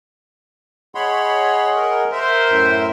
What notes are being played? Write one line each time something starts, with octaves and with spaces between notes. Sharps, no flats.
G#4 C#5 D#5 F#5 B5 C6
A#4
A#4 C5 E5
F#2 A2